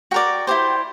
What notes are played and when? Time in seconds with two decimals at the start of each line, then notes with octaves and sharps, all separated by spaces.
0.11 F#4 A#4 D5 G5
0.47 E4 G4 C5